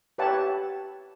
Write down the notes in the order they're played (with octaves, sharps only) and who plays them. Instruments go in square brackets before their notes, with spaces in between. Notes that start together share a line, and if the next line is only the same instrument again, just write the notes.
[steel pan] G4 B4 C#5 E5 F#5 A5